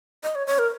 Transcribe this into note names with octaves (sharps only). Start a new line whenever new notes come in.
D#5
C#5
C#5
A#4